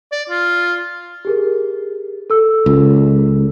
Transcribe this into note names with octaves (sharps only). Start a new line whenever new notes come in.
D5
F4
G4 G#4 A#4
A4 E6
C#2